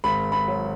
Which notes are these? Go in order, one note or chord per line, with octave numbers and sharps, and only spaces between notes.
G#1 B5
B5
F#3